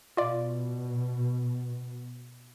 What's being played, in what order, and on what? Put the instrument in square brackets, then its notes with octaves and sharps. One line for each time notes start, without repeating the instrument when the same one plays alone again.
[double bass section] B2 [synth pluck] F4 D5